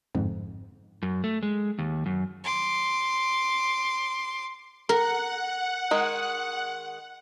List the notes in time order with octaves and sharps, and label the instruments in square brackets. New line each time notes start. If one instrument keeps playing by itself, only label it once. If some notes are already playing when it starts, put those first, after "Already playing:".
[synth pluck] G1 F2 G#2
[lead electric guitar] F#2
A3
G#3
D#2
F#2
[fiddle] C6 D6
[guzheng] A#4 [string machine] F#5
[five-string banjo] D#3 G#3